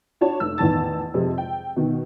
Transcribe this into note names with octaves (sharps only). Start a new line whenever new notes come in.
D4 F#4 C#5 A5
F1 E6
A1 E2 D#3 A5 A6
F2 C3 G#3
G5
B2 D#3